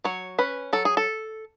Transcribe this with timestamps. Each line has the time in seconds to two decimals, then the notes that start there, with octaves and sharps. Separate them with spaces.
0.04 F#3 C#5
0.38 C#4 B4
0.73 F#3 A4
0.85 G#4
0.97 A4